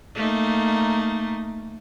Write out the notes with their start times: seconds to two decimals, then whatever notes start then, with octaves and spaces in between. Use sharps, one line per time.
0.15 A3 A#3 D#4